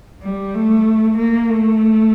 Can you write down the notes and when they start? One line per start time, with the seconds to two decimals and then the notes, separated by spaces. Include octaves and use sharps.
0.22 G3
0.54 A3
1.18 A#3
1.50 A3